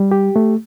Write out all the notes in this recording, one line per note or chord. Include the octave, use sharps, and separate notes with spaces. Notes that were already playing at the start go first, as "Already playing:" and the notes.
Already playing: G3
G4
A3